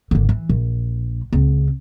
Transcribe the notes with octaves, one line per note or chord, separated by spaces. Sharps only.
G#1 D3
E3
A#1
C#2 C4